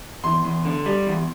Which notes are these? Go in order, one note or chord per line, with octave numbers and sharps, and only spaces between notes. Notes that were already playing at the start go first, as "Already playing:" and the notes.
E2 C6
E2
D3
G3
E2